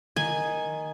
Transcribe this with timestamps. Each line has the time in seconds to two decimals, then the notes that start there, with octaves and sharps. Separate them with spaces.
0.16 D#3 G#5